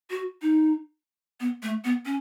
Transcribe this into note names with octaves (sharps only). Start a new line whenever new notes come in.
F#4
D#4
B3
A3
B3
C#4